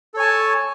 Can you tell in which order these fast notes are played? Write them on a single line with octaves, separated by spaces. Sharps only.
A4 C#5 G#5 A5